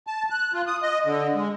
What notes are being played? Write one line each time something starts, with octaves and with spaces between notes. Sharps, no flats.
A5
F#6
F4
D#6
D#5
D3
G#3